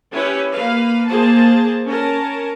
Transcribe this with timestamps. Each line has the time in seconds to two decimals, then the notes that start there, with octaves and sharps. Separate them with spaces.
0.11 C#4 E4 G4 B4 C#5
0.53 A#3 B4 F5
1.08 A#3 G#4 C5 A5
1.86 C#4 A#4 A5